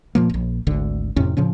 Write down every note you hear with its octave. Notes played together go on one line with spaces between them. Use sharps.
A#2 F3 A#3
D#1 A#1
G#1 D2 D3
F2 A2 C3 C#4
A2 C#3 F3 C#4